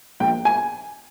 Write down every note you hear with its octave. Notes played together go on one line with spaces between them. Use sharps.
A#1 G5
G#5